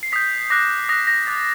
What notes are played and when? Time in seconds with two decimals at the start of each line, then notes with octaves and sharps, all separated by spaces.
0.03 C7
0.12 D#6 G6 B6
0.50 D6 F#6 A#6
0.89 D#6 F#6 A#6
1.07 A#6
1.27 D6 F#6 A6